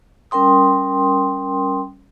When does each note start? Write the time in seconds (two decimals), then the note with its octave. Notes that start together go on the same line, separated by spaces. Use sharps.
0.31 G3 C#4 A#4 G5 C6 D#6